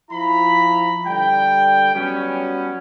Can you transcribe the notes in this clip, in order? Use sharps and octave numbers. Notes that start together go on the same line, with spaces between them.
F3 E4 A#5 B5
D3 G3 G5
F#3 G3 B3 C#4